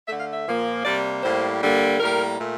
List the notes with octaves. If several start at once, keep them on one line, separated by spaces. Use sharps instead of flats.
D3 A3 E5
F5
E5
A#2 F3 A#3
C3 G3 A#3 D5
A2 G3 A#3 C5
D3 G3 A#3
A2 G3 A#3 A#4
A#2 A3